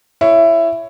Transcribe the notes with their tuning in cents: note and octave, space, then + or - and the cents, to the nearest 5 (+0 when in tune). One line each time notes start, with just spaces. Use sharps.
E4 +15 C#5 +0